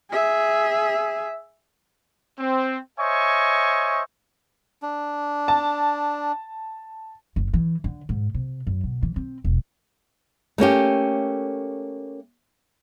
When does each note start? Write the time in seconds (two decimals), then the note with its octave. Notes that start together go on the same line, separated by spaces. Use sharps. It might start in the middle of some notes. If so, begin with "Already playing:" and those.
0.11 G#4 E5
2.38 C4
2.99 C5 C#5 D#5 E5 G#5 C#6
4.82 D4
5.48 A5
7.36 F#1
7.54 E3
7.84 D3
8.09 G#2
8.34 C3
8.67 F#2
8.84 B2
9.03 E3
9.16 C4
9.45 E1
10.58 A3 A#3 C#4 G4